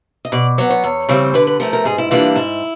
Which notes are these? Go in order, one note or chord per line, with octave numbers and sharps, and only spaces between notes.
D#5
B2 D5
F#3 B3 C#5
C#5
E2
C#3 E3 G3 C4
D3 B4
B4
F3 A3 A#4
A#4
G#2 G#4
E4
E3 G3 A#3 D4 F4
G#2 E4